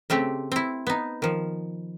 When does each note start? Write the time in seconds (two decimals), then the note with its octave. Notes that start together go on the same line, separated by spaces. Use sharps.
0.10 C#3 A3 C4 G4
0.52 C4 E4
0.87 B3 D#4
1.22 D#3 F3